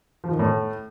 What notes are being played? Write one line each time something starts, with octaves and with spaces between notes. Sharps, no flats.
F3
D#3
A2